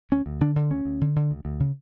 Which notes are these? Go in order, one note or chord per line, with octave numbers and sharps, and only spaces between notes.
D2 C#4
D2
D3 D4
D3
D2 C#4
D2
D3
D3
D2
D2
C#3